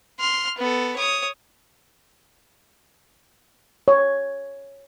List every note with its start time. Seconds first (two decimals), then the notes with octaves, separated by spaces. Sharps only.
0.19 C6 F6
0.58 B3 A4
0.96 C#5 D#6
3.88 C#5